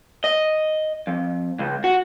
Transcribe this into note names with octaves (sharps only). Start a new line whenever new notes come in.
D#5
F2
C#2
F#4